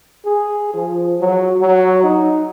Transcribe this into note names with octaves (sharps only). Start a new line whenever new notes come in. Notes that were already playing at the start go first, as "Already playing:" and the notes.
G#4
F3
F#3
F#3
D#4